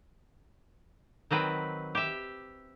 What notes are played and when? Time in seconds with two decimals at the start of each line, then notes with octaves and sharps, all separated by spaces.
1.31 D#3 F#3 C4 B4
1.95 G4 E5